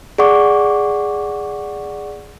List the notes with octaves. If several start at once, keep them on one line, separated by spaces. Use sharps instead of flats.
G#4 D5 F#5 C#6 D6